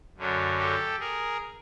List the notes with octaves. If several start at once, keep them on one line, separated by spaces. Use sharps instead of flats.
F#2 D3 F#3
G4 A4
G#4 A#4